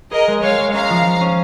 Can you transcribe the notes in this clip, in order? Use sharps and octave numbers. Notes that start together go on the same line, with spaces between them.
G#4 A#4 D#5
G#3
G#3 C#5 F5
G#3
C#4 F5 A#5
F3
F3
C#4